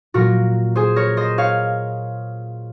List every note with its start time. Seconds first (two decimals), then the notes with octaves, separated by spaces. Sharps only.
0.14 A#2 F#3 F#4 A#4
0.76 G#4 C5
0.96 A#4 C#5
1.17 C5 D#5
1.38 C#5 F5